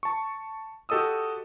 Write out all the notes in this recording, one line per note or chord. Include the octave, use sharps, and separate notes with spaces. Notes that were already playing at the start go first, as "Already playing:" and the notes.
A5 C#6
F#4 G4 A4 D#5 D#6 E6